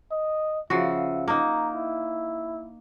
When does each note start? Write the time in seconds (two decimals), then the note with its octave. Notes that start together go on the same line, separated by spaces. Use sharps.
0.11 D#5
0.70 C#3 F3 F#4 E5
1.28 A#3 D#4 A#5
1.75 E4